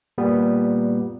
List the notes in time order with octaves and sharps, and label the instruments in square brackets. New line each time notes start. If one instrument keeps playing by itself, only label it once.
[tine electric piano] A#2 G3 B3